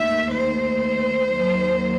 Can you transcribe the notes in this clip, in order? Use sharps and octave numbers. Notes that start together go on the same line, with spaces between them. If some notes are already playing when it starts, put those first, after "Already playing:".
Already playing: D#2 D#3 A3 E5
C5
D#2 D#3 F#3